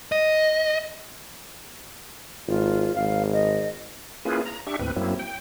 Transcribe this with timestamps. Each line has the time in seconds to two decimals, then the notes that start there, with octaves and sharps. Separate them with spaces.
0.12 D#5
2.48 G#1 F4
2.95 G#1 F5
3.33 D#5
4.25 A#3 C#4 E4 F4 G#4 B4
4.45 A#5
4.67 D4 G4 E5 C#6
4.79 D#2 A2 C4 B4
4.96 F#2 F#3 A#3 C4 E4
5.19 G5